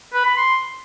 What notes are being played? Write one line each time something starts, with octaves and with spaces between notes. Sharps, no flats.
B4
B5
C6